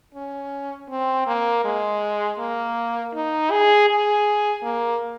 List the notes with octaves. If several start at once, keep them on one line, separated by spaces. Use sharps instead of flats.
C#4
C4
A#3
G#3
A#3
D#4
G#4
G#4
A#3